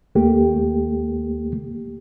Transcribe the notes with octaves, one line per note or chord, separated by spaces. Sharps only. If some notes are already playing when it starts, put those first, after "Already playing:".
D#2 A3 A#3 G4